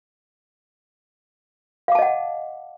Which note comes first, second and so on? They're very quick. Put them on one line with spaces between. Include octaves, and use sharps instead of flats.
F5 D6 A5 D#5 F#5